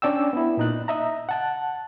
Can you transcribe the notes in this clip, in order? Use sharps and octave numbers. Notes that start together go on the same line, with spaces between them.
C#4 D4 D5 G5 E6
B3 E4
A#2 D#4 F#6
D#5 E5 A#5
F#5 A5 F#6